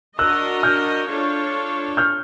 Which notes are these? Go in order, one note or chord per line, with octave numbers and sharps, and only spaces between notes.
D4 F#4 A#4 D#5 E6 F#6
F6 G6
D4 F4 A4 C#5
F6 G6